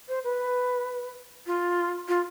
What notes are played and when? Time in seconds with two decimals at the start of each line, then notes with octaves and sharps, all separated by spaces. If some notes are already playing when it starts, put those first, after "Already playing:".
0.08 C5
0.24 B4
1.47 F4
2.08 F4